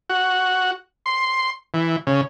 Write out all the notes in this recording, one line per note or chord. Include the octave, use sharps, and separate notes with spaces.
F#4
C6
E3
C#3